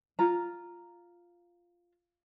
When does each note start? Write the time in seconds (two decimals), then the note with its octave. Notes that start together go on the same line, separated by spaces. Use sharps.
0.19 F4 A#5